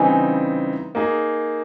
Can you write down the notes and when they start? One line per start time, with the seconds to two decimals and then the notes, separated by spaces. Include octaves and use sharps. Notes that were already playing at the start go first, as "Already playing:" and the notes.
Already playing: C#3 E3 G3 C4 D#4 G#5
0.95 A#3 D#4 G#4